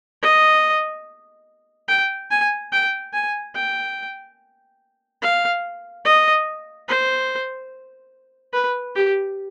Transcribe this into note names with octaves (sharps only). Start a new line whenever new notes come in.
D#5
G5
G#5
G5
G#5
G5
F5
D#5
C5
B4
G4